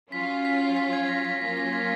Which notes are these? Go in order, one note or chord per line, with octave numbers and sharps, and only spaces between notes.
F#3 C#4 F4 B6
B6
B6
G#6
A#6
B6
F#3 A#3 C#4 F4 B6
A#6
G#6